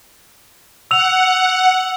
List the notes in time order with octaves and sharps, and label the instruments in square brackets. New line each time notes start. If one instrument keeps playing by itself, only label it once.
[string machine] F#5 [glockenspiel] E6 F7